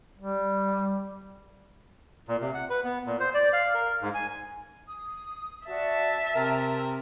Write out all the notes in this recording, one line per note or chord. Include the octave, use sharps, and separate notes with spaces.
G3
A#2
C3
F#5
B4
B3
A#2
C5
D5
F5
A#4
G#2
G#5
D#6
F#4 D5 E5 A5
C3 A#4 G5 A#5 E6